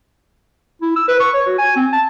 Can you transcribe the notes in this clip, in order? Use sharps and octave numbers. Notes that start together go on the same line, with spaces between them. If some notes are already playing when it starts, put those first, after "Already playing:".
E4
E6
B4
C#6
C#5
F#4
G#5
C4
A5